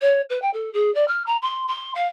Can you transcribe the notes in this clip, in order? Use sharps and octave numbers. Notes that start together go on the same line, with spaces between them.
C#5
B4
G5
A4
G#4
D5
F6
A#5
C6
C6
F5